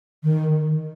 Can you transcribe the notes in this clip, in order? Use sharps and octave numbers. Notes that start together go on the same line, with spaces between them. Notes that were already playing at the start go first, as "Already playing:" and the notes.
D#3